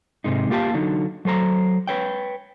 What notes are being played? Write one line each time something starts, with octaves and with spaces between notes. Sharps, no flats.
G#2 C3 G#3 D#4
A#3 F4 G4 F5 A5
D3 F#3 D#4
F#3 A4 C5 A#5
B4 C#5 G5